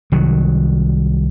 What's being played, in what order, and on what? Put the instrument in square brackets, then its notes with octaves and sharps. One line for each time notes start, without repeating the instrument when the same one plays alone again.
[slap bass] C2 D#3 F#3